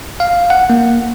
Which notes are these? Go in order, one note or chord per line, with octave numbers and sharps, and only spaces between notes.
F5
F#5
A#3